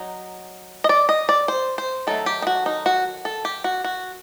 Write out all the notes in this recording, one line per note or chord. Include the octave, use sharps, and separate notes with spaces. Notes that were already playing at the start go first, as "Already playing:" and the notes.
Already playing: F#3 D#4
D#5
D5
D#5
D5
C5
C5
D#3 F#3 A3 A4
G4
D#4
F#4
D#4
F#4
A4
G4
F#4
F#4